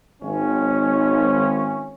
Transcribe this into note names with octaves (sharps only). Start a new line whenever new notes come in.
G#1 C#4